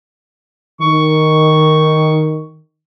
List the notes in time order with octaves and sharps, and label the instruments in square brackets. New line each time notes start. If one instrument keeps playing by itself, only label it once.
[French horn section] D#3 [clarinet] C#6